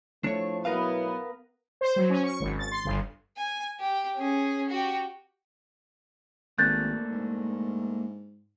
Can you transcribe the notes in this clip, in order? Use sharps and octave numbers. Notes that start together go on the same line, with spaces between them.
A2 F3 A3 D4 C#5
B1 F#3 B3 E4 A#4 B4 F5
C5
F#3
C#4
C#6
G#1
A6
C6
G1
G#5
G4
C#4 G#4
F#4 G4
G#1 A3 A#3 D4 F#6 G6 A6
G#2